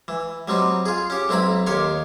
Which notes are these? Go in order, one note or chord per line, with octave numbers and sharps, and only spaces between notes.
E3
F#3 G3 C4 D#4
F4 G#4
C#4 G4
B1 C4 E4 A#5 B5
D#2 D#3 G4 C#5 C6